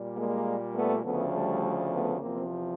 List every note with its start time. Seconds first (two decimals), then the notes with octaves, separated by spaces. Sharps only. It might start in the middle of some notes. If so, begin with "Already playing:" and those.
Already playing: A#2 G3
0.15 G#3 A#3
0.74 A3 B3
1.03 D2 C#3 F3 A3 B3
1.33 G3 A3
1.91 A3 B3
2.21 E2 C3 F3 A#3 C4